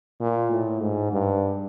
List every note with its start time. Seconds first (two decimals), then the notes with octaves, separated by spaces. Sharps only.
0.20 A#2
0.51 A2
0.82 G#2
1.12 G2